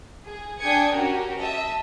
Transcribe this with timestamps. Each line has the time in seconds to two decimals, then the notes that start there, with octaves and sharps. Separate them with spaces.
0.24 G#4
0.59 D4 G5 G#5 D#6 G#6 C#7
0.90 C#4 F#4 G4 A#4
1.37 D#5 E5 A5